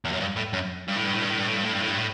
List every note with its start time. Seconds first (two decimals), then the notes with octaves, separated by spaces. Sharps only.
0.05 E2
0.12 F#2
0.20 G2
0.36 A2
0.53 F#2
0.88 G2
0.96 A2
1.04 G2
1.13 A2
1.21 G2
1.29 A2
1.37 G2
1.47 A2
1.55 G2
1.63 A2
1.72 G2
1.81 A2
1.88 G2
1.97 A2